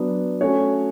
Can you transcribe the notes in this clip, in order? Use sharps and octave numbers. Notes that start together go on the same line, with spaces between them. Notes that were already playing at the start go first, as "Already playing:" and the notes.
Already playing: F#3 B3 D4
A3 C#4 F#4 C#5